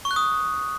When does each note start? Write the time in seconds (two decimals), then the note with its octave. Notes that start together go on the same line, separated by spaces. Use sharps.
0.05 C#6
0.11 F#6
0.16 D#6